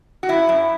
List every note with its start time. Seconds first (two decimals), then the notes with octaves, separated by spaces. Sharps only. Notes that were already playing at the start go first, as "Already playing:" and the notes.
0.23 F#4
0.29 F#2 E4
0.49 F#2